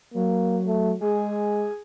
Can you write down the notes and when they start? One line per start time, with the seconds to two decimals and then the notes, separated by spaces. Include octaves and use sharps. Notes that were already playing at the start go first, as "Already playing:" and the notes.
0.14 F#3 A#3
0.67 A3
1.01 G#3 G#4